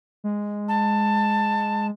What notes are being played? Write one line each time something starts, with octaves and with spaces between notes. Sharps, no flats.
G#3
A5